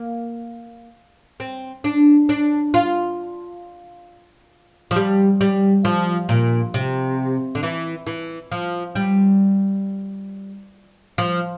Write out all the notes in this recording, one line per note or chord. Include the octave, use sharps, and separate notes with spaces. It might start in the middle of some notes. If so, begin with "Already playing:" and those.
Already playing: A#3
C4
D4
D4
F4
F3
G3
G3
F3
A#2
C3
D3
E3
E3
F3
G3
F3